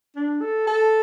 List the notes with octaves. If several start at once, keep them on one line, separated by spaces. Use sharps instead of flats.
D4
A4
A4